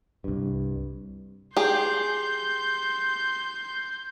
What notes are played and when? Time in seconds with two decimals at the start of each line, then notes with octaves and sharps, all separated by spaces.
0.24 C2 G2
1.57 G4 G#4 C6 G6